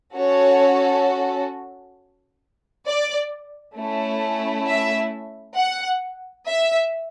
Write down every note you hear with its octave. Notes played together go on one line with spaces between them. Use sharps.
C#4 F#4 A4 C#5
D5
A3 C#4 E4
E5
F#5
E5